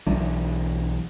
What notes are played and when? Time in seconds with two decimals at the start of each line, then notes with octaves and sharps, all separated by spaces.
0.07 B1 E3 F#3 D4